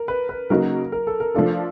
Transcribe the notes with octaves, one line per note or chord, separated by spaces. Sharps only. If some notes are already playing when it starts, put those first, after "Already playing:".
Already playing: A#4
B4
B4
C#3 F#3 A#3 D#4 F#4 A#4
A#4
A4
A#4
F3 A3 D4 F4 A4